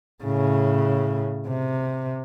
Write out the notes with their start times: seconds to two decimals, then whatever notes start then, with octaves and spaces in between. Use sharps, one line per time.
0.24 A2 C#3
1.48 C3